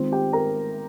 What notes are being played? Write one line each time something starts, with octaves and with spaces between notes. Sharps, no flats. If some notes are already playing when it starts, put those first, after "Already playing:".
Already playing: D#3 G#3 C4 F4
G4 G5
A#4 A#5